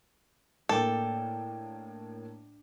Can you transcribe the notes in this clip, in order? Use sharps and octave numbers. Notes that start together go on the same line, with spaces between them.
A2 A#3 D4 A4 G5